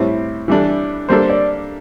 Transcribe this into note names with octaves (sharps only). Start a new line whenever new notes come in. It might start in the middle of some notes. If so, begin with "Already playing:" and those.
Already playing: A2 G3 C4 E4
E3 G3 D4 A4
G3 A#3 D4 A4 C5
D5